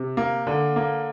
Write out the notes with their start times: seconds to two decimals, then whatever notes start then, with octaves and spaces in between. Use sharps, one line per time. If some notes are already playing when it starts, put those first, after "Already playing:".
Already playing: C3
0.17 A#3
0.47 D3
0.76 A#3